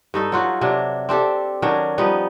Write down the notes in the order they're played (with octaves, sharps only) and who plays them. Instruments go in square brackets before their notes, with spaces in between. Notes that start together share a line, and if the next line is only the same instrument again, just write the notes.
[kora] G2 D#4 A4
F#3 F4 F#4
C3 F#3 D4
C4 D4 G4 A4
D#3 F#3 C#4 D4
F3 G3 B3 D#4